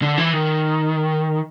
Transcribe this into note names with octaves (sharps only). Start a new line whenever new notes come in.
D3
E3
D#3